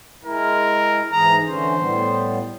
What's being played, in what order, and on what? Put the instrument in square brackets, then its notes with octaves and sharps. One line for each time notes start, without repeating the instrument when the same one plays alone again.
[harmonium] G#3 E4 [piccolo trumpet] A#4
[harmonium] G#2 E3 G#4 [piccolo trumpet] A#5
[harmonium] D3 E3 C#4 [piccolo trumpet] C5
[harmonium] A2 G3 B3